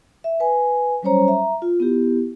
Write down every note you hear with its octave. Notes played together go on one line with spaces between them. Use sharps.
E5
B4 G#5
F#3 G3 C#4 C5 C#5 A#5
E5 A#5
F4
B3 E4 G4